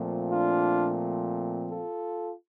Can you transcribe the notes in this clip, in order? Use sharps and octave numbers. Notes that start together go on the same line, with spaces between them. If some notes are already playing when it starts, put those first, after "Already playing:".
Already playing: A#2 F3 A3 C4
D4 F4
F4 A4